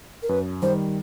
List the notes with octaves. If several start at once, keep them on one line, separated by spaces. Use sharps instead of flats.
A#4
F#2 B4
D#3 G3 C5